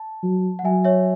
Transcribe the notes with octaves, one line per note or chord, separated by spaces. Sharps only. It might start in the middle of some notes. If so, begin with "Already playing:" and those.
Already playing: A5
F#3
F#5
F#3 E5 G#5
C#5 E5